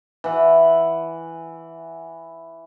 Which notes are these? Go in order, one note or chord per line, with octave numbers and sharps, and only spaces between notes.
E3 F#5